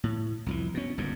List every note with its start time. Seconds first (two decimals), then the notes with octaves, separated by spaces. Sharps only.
0.04 A2
0.46 C2 F2 E3
0.74 B2 C#4
0.98 G1 C#2 G2 A#2